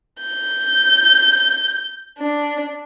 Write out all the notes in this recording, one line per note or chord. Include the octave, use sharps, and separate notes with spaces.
G6
D4